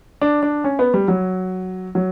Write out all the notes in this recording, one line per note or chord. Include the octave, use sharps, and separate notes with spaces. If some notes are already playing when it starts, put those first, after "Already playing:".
D4
D4
C#4
B3
G3
F#3
F#3